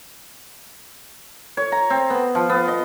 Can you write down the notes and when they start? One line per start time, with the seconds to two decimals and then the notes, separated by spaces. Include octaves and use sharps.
1.57 C#5
1.72 A#5
1.90 C4
2.10 B3
2.35 F3
2.50 B3
2.68 D#5